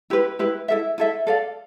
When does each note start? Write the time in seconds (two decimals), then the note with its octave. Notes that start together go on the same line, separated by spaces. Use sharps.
0.10 E4 G4 B4
0.39 E4 G4 B4
0.68 E4 A4 E5
0.98 E4 A4 E5
1.27 A4 D5 F5